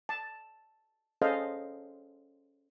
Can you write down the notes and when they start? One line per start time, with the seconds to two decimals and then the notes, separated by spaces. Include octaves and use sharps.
0.09 A5
1.22 C#4 G#4 A4 C5 D#5 F5